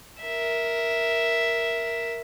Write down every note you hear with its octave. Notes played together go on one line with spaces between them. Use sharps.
A#4 E5